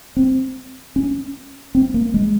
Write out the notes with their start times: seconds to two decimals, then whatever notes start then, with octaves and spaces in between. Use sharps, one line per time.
0.17 C4
0.96 C#4
1.75 C4
1.94 A#3
2.14 G#3